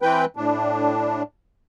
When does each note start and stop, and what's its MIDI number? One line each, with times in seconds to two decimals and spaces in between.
0.02 0.25 52
0.02 0.25 60
0.02 0.25 71
0.02 0.25 79
0.37 1.22 45
0.37 1.22 62